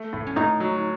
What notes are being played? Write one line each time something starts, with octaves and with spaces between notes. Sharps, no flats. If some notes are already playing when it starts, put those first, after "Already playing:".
Already playing: A3
A2 E4
C#4
A2 D#4
F#3